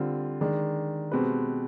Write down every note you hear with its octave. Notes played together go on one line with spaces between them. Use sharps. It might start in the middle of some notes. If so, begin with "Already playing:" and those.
Already playing: D3 G3 C4 F4
D#3 G#3 D4
B2 G#3 C4 G4 B4